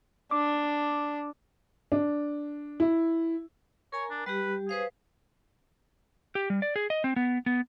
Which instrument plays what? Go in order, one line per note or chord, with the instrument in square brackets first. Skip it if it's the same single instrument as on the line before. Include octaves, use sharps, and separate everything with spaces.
[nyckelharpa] D4 [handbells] D6
[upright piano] D4
E4
[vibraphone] A#4 G#5 A#5 [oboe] C#5
[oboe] D4
[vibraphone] G3 G4 [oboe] B4
[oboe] G#4 [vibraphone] B4 C5 F5
[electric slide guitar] G4
G3
D5
G#4
D#5
C4
B3
B3